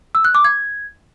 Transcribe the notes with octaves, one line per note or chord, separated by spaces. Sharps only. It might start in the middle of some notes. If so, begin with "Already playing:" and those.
E6
F#6
D6
G#6